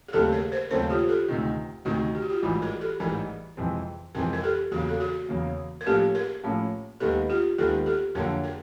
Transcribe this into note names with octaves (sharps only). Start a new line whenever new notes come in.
G#4
D#2 C#3 F#3 A3 C4 G4 A4
G#4 A#4
A#4 C5
D#2 C#3 F#3 A3 C4 A#4 C5
F4 G4
G4 A4
D2 C3 D#3
D2 C3 D#3 F#4 G#4
G4
F#4
F4 G4
A1 G#2 E3 G3 E4 F#4
G#4 A#4
G4 A4
A1 G#2 E3 G3 G#4 A#4
F2 C3 E3 G#3 C4
F2 C3 E3 G#3 C4 G#4 A#4
A#4
G4 A4
E2 C#3 F#3 A#3 F#4 G#4
A4
F#4 G#4
E2 C#3 F#3 A#3
A#4
A2 F3 A#3 C#4 G4 A4
G#4 A#4
A2 F3 A#3 C#4
D#2 D#3 G#3 B3 G4 A4
F4 G4
D#2 D#3 G#3 B3 G4 A4
G4 A4
F2 D3 F#3 A#3 G#4 A#4
G#4 A#4